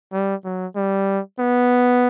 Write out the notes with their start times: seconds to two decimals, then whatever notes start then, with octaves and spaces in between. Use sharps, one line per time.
0.13 G3
0.44 F#3
0.76 G3
1.39 B3